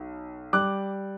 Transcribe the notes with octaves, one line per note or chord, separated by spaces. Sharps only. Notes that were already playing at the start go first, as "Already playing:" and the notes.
Already playing: B1
G3 D6 F#6